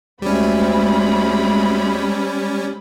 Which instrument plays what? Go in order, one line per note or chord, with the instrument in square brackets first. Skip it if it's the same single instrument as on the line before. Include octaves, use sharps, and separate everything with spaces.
[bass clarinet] D2 [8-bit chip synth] G3 C#4 [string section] G#3 C4 B5